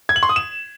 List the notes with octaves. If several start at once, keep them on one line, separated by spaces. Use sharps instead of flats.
G#6
F#7
C6
D#6
E7